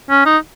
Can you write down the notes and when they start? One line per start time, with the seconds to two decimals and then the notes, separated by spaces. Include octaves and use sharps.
0.10 C#4
0.26 D#4